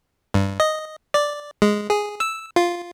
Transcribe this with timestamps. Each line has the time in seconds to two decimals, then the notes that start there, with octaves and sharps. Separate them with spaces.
0.34 G2
0.60 D#5
1.14 D5
1.62 G#3
1.90 G#4
2.20 E6
2.56 F4